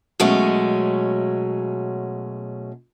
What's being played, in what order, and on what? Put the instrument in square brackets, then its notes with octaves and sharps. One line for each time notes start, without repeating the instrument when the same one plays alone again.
[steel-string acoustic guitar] B2 F#3 G#3 A3 C#4